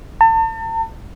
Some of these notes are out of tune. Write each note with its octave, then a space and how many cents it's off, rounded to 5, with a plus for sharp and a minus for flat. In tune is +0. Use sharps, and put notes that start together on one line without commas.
A5 +40